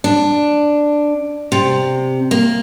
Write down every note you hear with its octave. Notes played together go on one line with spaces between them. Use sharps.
D4
C3
A#3